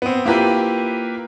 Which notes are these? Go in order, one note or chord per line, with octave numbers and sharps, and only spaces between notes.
B3 C4
A#3 E4 F4 G4 A#4 B4